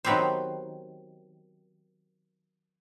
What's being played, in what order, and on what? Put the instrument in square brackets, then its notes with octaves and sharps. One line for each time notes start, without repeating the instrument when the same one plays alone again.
[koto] D#3 F#3 B3 C4 G4 C5